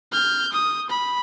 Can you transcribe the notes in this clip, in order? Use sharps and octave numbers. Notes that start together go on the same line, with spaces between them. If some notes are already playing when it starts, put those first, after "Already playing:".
F6 G6
D#6
B5